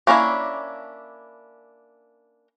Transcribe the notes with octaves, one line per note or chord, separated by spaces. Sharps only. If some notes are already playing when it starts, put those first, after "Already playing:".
A#3 C#4 D4 E4